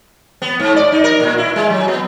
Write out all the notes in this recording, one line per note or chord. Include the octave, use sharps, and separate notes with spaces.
B3
G#2
D5
D#4
A#4
A#2
E4
G#3
F#3
B3